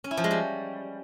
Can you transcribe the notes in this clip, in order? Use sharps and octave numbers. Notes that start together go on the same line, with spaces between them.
C#4
E4
F3
G#3
G3